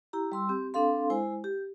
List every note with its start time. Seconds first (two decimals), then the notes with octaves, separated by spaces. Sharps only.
0.13 E4 G4 A#5
0.32 G3 C6 E6
0.49 C4 G4
0.74 C4 D4 A4 F5 C6
1.10 G#3 E4 C5 G#5
1.44 G4